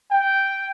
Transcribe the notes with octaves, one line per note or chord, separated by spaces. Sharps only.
G5